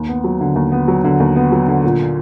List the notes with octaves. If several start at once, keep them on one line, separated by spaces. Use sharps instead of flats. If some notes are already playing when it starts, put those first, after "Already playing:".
Already playing: D#2
B3
F#3
D3
D#2
B3
F#3
D3
D#2
B3
F#3
D3
A#2
F4